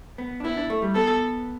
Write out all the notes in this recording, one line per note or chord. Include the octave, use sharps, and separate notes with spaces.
B3
D4
B3 E4
D4
A3
G3
B3 A4